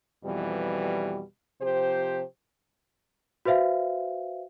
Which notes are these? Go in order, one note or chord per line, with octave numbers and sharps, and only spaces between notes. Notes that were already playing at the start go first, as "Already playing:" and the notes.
F2 B2 E3 G3
C3 F3 G4 C5
F#4 B4 C5 E5 F5